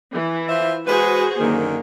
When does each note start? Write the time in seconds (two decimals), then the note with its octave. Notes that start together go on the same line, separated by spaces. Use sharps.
0.14 E3
0.49 F4 C5 E5
0.87 G#3 F#4 G#4 B4 C5
1.41 F#2 D3 D#3 A#3